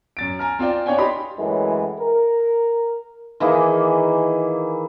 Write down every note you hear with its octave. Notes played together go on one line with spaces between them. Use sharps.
F#2 A6 D7
G#5 A#5 F6
C4 F4 D5 G5
D4 C#5 F5 G5 G#5
G4 D#5 B5 C6
F#2 A2 E3 G#3
A#4
D#3 E3 A#3 G#4